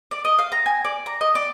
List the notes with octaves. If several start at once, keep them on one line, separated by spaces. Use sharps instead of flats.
D5
D#5
F5
A#5
G#5
D5
A#5
D#5
D5